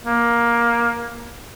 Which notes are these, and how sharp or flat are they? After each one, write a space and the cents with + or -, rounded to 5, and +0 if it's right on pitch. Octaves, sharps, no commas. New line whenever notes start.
A#3 +15